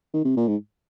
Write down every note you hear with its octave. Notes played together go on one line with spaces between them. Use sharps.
D#3
C3
A#2
G#2